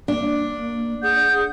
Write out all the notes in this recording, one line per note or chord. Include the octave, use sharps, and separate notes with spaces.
A#3 D4
G#4 F#5 D#6 G6